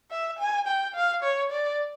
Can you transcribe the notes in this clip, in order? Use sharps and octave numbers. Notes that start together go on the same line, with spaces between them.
E5
G#5
G5
F5
C#5
D5